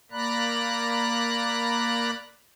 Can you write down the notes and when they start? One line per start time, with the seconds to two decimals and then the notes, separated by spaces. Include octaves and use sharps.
0.11 A#3 D5 A#5 B5 F#6